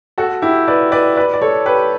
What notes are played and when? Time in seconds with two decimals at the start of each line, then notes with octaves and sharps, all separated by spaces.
0.18 F#4 A4
0.42 E4 G4
0.68 B4 D5
0.92 B4 D5
1.16 B4 D5
1.34 D5
1.41 A4 C#5
1.65 G4 B4